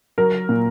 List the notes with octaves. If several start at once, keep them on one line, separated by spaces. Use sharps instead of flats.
F#3 A#4
A#2